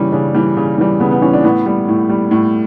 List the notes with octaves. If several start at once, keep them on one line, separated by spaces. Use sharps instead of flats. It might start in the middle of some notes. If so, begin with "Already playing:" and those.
Already playing: C#3 E3 G3 C#4
C#3 D4
E3 G3
C#3
E3 G3
C#3 B3
B3
E3 G3 C#4
D4
A2 B3
G3
A2
G3
A2